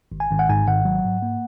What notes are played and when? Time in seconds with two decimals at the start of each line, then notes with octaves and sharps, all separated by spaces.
0.12 G#1
0.20 G#5
0.31 G#1
0.39 F#5
0.49 G#2 G#5
0.68 G#1 F#5
0.85 F#3
1.05 G#2
1.22 A#3